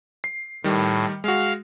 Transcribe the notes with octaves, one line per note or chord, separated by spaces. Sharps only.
C7
A2 D#3 G3
G#3 F#4 F5